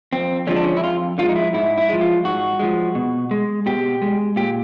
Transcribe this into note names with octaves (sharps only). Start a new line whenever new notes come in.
F2 C4
D3 F3 G#3 C#4
D4
C#4
E4
F2 F4
D3 F3 G#3 F4
D#4
E4
G#2 E4
E4
F3 G#3
F4
G#2 F#4
F3 G#3
B2
G#3
B2 G4
G#3
A#2 G4